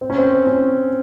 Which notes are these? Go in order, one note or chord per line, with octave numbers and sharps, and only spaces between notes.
C4
C#4
C4
C#4